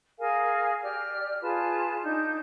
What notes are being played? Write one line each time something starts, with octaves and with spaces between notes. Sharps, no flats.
G#4 A#4 F5 G#5
G4 D5 F6
F4 G#4 B4 A5
D4 D#4 G6